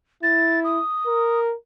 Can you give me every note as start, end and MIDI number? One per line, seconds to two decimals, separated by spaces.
0.23 0.79 64
0.23 0.59 93
0.64 1.40 87
1.06 1.54 70